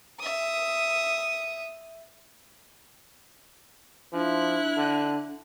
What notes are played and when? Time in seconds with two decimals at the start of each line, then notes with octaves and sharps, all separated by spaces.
0.20 E5 D#6
4.13 F3 D4 E4 F#6
4.77 D3